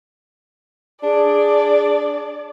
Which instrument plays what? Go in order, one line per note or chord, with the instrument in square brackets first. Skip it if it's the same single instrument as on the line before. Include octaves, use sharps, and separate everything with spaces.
[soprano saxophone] D4 [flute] G#4 [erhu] D5